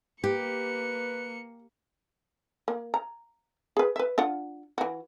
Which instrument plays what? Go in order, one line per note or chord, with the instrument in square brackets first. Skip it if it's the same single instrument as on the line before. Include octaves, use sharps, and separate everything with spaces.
[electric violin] A#3 C#7 [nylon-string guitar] G4 [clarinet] B4
[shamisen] A#3
A#5
G#4 B4
B4 E5
D4 F4 F#5
E3 F#4